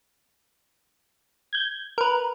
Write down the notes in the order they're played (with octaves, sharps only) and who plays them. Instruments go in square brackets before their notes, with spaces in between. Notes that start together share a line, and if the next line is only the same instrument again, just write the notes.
[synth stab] G6 G#6
A#4 B4